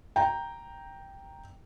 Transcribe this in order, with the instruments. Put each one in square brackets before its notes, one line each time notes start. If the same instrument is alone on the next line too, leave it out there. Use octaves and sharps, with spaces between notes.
[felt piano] G5 A#5